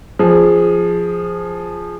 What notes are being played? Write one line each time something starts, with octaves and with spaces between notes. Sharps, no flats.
F3 G#4